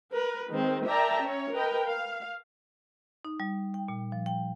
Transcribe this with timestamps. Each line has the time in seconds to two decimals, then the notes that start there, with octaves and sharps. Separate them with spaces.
0.12 A#4 B4
0.51 D#3 G#3 C4
0.86 A#4 D5 E5 G5 A5 A#5
1.22 C#4 C#5
1.53 A#4 B4 D#5 G5
1.84 F5
3.25 D#4
3.40 G3
3.74 G5
3.88 A#2
4.12 F3
4.26 G5